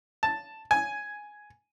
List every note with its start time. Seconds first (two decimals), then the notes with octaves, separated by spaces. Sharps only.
0.23 A5
0.71 G#5